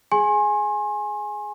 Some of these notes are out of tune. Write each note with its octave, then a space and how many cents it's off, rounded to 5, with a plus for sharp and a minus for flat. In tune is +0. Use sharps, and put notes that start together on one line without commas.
G#4 +0 G#5 +0 C6 +40